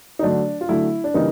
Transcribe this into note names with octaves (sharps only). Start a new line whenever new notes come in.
D#4
D3 F#3 A3 D4
F4
D3 F#3 A3 E4
D4
C#3 E3 G3 A#3 D#4